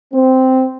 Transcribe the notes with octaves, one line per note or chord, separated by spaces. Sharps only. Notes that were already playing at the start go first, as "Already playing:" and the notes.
C4